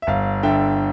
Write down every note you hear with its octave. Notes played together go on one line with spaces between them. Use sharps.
E5
G1 F5
D3 E5 G5